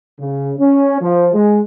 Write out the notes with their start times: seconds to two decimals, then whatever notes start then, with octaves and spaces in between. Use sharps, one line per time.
0.20 C#3
0.59 C#4
1.01 F3
1.34 G#3